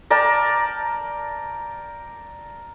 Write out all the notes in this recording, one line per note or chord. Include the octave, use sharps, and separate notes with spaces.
A#4 D5 G5 A5